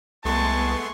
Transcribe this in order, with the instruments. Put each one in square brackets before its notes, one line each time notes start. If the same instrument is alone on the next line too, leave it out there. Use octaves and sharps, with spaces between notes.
[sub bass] C2 [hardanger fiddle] G#3 C#6 [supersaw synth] A3 B3 C6 [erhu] A5